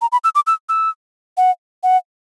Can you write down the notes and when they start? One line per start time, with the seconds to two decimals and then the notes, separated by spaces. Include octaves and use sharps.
0.02 A#5
0.12 B5
0.24 E6
0.35 D6
0.47 E6
0.69 E6
1.37 F#5
1.83 F#5